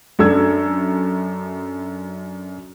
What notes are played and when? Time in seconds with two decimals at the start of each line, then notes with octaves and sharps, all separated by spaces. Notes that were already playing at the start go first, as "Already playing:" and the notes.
0.19 F#2 D4 A4 E6 G#6